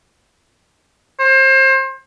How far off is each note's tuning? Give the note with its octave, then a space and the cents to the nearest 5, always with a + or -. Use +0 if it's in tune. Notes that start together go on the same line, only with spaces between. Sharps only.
C5 +30